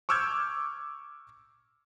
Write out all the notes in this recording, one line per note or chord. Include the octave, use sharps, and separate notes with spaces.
C#6 D6 E6 F6 G6 G#6